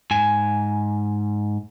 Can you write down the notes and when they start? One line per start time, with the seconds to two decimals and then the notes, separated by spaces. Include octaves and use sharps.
0.11 G#2 G#5